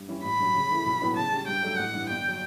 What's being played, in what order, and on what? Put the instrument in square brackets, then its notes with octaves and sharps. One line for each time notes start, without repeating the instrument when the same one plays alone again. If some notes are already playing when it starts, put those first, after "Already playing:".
Already playing: [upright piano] G2
E3 G3 C#4 E4
[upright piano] A1 [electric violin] B5
[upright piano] G2 F#3
C#3
E3 A3 E4
B1
A2 F#3 B3 E4
[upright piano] C#3 [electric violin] A5
[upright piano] G3 C#4
[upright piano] G2 [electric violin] G5
[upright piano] F#3 A3 D4
[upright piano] A1 [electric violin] F#5
[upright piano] G2 E3
[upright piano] G1 [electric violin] G5
[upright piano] F#3